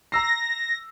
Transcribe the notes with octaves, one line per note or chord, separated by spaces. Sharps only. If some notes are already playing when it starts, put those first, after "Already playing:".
A#5 E6 A#6 C7